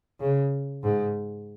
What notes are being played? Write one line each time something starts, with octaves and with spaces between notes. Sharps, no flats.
C#3
G#2